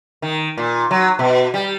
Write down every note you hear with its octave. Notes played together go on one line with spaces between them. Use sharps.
D#3
A#2
F#3
B2
G3